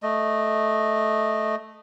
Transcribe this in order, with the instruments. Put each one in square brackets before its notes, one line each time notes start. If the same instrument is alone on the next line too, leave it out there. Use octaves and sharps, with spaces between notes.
[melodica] A3 D#5